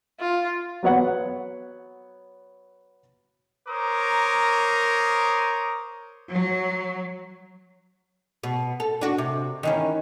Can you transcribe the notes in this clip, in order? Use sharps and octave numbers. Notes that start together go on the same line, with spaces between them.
F4
F#3 B3 C#5 F#5
A#4 C5 C#5 A#5 D6 D#6
F#3
B2
A4
D4 F#4
C3
D#3 E3 C#4